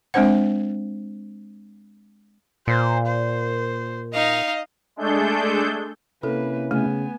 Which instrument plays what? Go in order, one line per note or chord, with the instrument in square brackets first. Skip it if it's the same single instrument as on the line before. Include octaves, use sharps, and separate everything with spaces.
[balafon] G#3 C4 D4 C5 F#5
[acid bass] A#2 [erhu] C5
[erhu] C5
[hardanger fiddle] D#4 F5 [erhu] D#5
[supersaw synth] G#3 A3 D4 G#4 A4 G6
[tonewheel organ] C3 C#4 E4 [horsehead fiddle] A#3 B4 [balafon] A4
[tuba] C#3 [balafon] A3 [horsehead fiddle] B3 G#5